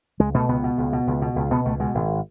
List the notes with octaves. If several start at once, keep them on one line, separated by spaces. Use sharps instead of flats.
C#2 G#3
B2 A3
C#2 B3
B2
C#2
B2
C#2
B2
C#2
B2 B3
C#2 A3
B2 G#3
G#1